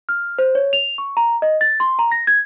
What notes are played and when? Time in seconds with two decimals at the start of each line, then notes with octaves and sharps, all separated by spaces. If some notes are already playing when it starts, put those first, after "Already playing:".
0.09 F6
0.39 C5
0.55 C#5
0.73 F7
0.98 C#6
1.17 A#5
1.42 D#5
1.61 A6
1.80 C6
1.99 A#5
2.12 A#6
2.27 G#6